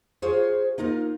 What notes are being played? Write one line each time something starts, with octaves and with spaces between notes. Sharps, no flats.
F4 G#4 C5 C#5
A#3 D#4 F4 A#4